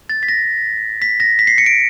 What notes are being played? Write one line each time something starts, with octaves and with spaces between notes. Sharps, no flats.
A6
B6
A#6
B6
A#6
B6
C7
C#7
D7